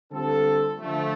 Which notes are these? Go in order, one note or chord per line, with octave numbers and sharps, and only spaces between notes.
D3 G3 C4 F4 A4
D3 F3 A3